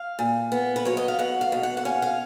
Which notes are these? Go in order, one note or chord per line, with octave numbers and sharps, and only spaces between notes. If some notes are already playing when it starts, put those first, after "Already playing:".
Already playing: F5
A#2
B3
B4
F#3 C#5
D#5
F5
B2 F#5
F5
B2
F#5
F#5
C#4 F5
F5